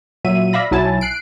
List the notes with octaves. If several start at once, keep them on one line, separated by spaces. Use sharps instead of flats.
A#2 F#3 E5 D#7
D5 E5 F5 B5 A#6
B1 F#3 E4 G#5 A5
F#6 C7 D7